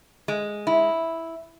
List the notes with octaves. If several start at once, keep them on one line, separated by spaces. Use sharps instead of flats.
G#3
E4